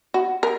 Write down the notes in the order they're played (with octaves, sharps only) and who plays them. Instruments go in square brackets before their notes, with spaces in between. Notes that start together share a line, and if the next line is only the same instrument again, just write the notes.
[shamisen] F#4
A#4